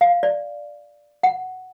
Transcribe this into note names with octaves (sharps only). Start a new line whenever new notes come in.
F5
D5
F#5